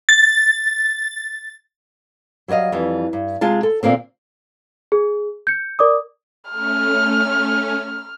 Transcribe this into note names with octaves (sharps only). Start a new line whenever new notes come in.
A6
F#3 G3 C#5 D#5 F5
F2 E3 G3
G2
C3 G#3 F4 A5
A4
A#2 D3 A#3 C4
G#4
G6 C#7
A#4 D5 D6 D#6
A3 C#4 F6